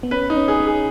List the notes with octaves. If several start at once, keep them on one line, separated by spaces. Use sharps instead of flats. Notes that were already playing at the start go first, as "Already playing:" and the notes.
B3
C#4 B4
D#4
C#4
G#4
C#4
G#4